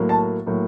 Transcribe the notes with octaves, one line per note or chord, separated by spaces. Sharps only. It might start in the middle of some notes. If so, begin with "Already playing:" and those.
Already playing: A2 F#3 A#3
A5
A2 F#3 A#3